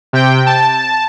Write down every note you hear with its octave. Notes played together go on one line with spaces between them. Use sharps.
C3 G5
A5